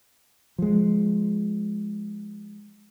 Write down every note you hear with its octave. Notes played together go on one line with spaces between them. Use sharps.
F3 G#3